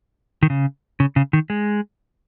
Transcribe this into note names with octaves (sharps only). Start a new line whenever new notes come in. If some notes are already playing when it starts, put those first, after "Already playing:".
D#3
C#3
C#3
C#3
D#3
G#3